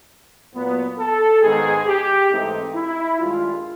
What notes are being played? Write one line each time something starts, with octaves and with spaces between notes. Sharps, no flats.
A#2 F#3 B3
A4
G#2 D#3 G#3 B3 G#4
G4
G#2 E3 A3 C4 D#4
E4
G2 D#3 G#3 F4